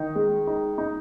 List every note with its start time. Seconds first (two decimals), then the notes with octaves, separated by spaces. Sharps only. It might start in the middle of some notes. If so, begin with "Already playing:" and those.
Already playing: D#3 D#4
0.16 G#3
0.47 D#4
0.78 D#4